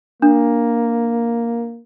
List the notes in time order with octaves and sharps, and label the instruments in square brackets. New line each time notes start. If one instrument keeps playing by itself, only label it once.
[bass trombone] A#3 [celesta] D4